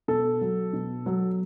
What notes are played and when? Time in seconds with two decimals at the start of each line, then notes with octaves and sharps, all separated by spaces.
0.08 B2 A4
0.41 F#3
0.73 B2
1.06 F#3